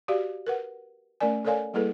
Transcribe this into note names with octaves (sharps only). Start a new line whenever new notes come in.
F#4 G4 D5 F5
A#4 B4 F#5
A3 C#4 A#4 D5 G#5
A4 A#4 C#5 D5 F5 G#5
G3 A#3 E4 G#4 A4 B4